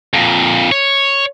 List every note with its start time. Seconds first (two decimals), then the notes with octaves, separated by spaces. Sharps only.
0.13 F2 A#2
0.72 C#5